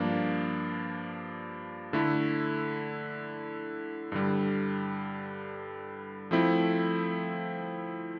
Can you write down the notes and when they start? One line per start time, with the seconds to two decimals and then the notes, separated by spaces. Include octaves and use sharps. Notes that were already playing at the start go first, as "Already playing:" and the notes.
Already playing: G2 F3 A#3 D4
1.93 D3 A3 E4
4.12 G2 D3 G3
6.31 F3 A3 C4 E4